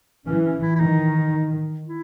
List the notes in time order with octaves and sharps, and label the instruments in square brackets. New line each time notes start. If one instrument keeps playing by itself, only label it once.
[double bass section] E3 [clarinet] C#4
[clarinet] C#4
E4
E4
[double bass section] D#3 [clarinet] D#4
[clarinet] E4